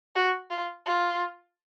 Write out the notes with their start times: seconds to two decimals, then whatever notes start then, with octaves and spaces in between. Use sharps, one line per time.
0.15 F#4
0.50 F4
0.86 F4